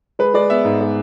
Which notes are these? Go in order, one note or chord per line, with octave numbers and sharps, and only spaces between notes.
G#3 B4
G#3 D5
B3 E5
G#2
G#3